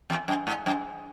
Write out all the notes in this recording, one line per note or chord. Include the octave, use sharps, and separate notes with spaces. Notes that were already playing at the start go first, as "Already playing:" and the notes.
E2
F#2
G#2
F#2